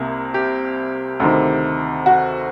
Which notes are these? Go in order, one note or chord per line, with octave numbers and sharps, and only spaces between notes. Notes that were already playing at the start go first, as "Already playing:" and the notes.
Already playing: C2 C3 A#3
G4
D2 C3 D#3
F#4